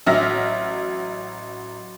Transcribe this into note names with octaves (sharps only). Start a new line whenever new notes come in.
A1 F#3 E5 F6 A#6